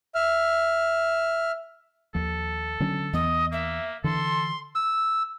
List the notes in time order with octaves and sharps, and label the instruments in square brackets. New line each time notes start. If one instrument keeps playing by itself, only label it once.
[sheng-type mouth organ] E5 F6
[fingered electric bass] D#2 F3 [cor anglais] A4
[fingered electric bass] D3 F#3 C#4
[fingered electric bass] E2 E3 B3 [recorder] D#5
[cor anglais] A#3 [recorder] E5
[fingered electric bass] D3 E3 [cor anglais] A4 [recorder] C6
[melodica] E6